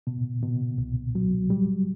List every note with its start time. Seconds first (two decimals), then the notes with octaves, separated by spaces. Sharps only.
0.07 B2
0.43 B2
0.78 C2
1.15 F#3
1.50 G3